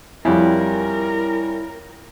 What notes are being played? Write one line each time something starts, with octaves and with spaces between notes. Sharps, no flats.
F2 G3 E4 A#4 C#5 G#5